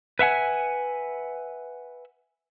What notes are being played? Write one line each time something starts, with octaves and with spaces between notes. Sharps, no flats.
B4 E5 F#5 G#5